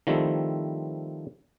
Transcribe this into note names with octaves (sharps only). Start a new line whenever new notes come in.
D#3 F3 G3 A3 C4 E4